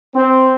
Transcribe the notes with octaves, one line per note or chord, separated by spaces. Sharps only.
C4